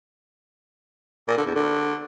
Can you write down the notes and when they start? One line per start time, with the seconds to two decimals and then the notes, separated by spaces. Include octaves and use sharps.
1.28 A#2
1.37 D3
1.46 E2
1.55 D3